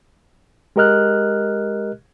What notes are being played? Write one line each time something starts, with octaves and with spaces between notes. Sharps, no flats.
G#3 G4 A#4 D#5 F6 F#6